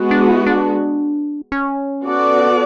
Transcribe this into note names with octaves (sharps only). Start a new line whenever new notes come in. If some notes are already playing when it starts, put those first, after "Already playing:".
Already playing: G#3 B3 F#4
D4
E4
D4
C#4
B3 F#4 A4 D5